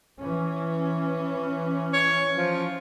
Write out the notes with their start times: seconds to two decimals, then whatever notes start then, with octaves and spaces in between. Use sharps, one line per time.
0.19 E3 C#4
1.93 C#5
2.35 F3